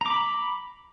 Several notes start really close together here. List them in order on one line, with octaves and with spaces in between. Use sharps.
A#5 D6 B5